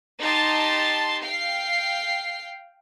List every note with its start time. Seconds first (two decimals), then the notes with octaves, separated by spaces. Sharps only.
0.21 D#4 G4 A5 C6 A6
1.21 F5 G5 C7